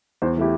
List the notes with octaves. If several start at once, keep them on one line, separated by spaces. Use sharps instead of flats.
E2 C5
E3 A3 E4 G4